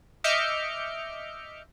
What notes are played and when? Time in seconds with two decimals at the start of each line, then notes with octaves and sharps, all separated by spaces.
0.24 D#5 E5 D6 F6 G6 C#7